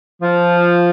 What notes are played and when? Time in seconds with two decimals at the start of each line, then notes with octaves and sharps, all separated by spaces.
0.22 F3